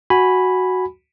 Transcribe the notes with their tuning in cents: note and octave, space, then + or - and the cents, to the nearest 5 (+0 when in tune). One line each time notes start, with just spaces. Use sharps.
F#4 +0 G#5 -5 B5 +0